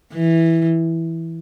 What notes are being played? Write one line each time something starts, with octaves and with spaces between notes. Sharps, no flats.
E3